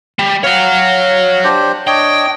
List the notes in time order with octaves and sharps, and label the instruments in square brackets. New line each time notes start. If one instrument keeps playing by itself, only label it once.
[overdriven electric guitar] G3
[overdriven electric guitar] C#5 F#5 [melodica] F5
[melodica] D4 G4 C5
[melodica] D4 C#5 D#5 [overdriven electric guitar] G5